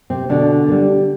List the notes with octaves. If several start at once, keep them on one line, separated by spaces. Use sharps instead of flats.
C3 C4
B2 D3 D4
A#3
G3